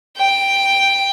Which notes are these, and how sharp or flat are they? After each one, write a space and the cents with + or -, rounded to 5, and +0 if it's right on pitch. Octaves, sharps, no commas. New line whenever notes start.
G5 +5